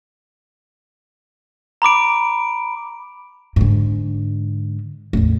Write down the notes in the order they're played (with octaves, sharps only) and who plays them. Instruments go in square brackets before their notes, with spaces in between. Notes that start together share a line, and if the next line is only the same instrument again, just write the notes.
[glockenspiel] A#5 B5 D6 D7
[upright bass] G#2 D3
A1 E2